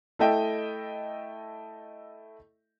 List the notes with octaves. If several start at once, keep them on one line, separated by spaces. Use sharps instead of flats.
A3 E4 A4 D#5 E5 G5